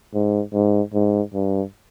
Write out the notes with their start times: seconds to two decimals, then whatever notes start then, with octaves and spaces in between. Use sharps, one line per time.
0.14 G#2
0.53 G#2
0.94 G#2
1.34 G2